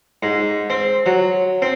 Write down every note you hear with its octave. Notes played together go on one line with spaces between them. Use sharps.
G#2
C4
F#3
C4